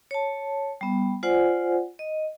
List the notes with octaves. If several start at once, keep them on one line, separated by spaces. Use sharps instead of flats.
C#5 A5
G3 B3
F4 C5 D5 F#5 G#5
D#5